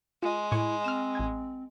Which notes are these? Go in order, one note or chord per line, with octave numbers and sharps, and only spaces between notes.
G#3 F4
A2 E4 G#5 C#6
C4 F6 E7
A1 G#5 G#6